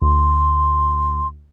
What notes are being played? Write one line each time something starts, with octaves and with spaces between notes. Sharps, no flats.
D2 C6